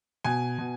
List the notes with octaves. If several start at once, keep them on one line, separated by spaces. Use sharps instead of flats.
B2 G#5
B2